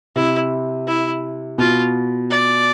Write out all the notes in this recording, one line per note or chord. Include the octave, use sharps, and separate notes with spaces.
C3 E4
E4
B2 F4
D5